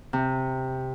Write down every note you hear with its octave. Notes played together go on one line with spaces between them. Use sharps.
C3